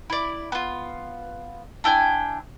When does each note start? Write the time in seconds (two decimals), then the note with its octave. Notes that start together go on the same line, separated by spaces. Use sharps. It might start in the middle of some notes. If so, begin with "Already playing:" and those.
0.10 E4 D5
0.52 B3 F4
1.84 D4 E4 G5 G#5